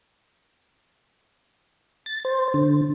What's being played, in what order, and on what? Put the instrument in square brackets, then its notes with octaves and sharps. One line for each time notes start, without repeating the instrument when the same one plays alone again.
[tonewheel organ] A6
C5
D3